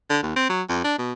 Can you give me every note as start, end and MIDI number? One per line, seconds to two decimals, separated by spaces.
0.10 0.18 50
0.23 0.32 39
0.36 0.49 60
0.50 0.62 54
0.69 0.83 41
0.84 0.94 62
0.99 1.13 47